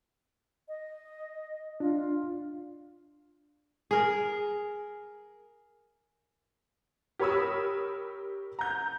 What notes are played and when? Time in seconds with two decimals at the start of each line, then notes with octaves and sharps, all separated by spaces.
0.68 D#5
1.80 D4 F4
3.91 G#4 A#4
7.19 G4 A#4 C#5 B5 D#6 E6
8.59 A#5 G6